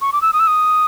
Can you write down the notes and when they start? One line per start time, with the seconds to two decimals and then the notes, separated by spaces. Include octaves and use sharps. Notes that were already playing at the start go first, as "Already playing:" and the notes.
0.01 C#6
0.13 D6
0.22 E6
0.33 D#6
0.40 E6
0.47 D#6